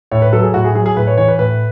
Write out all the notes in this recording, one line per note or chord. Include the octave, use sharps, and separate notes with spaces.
A2 C#5
B4
F#3 A4
G#4
A2 F#4
G#4
F#3 G#4
G#4
A2 B4
C#5
E3 C#5
B4
A2 B4